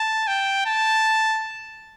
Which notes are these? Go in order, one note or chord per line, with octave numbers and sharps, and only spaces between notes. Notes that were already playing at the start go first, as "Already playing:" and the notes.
Already playing: A5
G5
A5